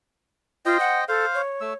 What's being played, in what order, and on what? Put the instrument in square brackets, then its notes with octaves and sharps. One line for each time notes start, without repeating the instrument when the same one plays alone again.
[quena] F4 [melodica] C5 D#5 G5
[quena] F#5
[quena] A4 [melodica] C5 F5
[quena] C#5
[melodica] A3 E6